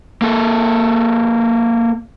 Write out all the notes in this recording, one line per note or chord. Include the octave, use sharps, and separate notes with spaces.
A#3 A4